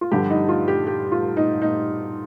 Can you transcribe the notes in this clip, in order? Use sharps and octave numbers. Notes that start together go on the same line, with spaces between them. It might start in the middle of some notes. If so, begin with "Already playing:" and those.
F4
G2 D3 F3 G4
D#4
F4
G4
G4
F4
D#4
D#4